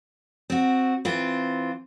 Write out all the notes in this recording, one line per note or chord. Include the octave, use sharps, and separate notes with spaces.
C4 F#4
E3 C4 F4